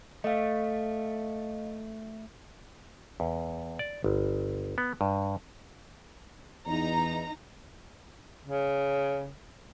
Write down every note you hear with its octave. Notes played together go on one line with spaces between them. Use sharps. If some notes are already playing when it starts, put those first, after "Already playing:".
A3 D#5 F5
E2
D5
G1
B3
G2
E2 D#4 A#5
C#3